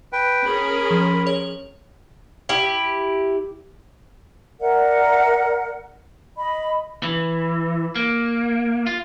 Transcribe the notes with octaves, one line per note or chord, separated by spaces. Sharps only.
B4 G5
C#4 G#4 A#4 B5
F3
C#5 F7
E4 G4
A#4 D5 E5 F#5
D#5 B5
E3
A#3
F4